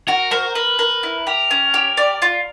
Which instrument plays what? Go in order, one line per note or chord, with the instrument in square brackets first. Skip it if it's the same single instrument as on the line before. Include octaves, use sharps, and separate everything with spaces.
[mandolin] F#4 [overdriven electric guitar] A#4
[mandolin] A#4 [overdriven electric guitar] C5
[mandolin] A#4 [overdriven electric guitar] B4
[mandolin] A#4
E4
[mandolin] G4 [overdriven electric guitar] A#4
[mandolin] C#4
G4
D5
F4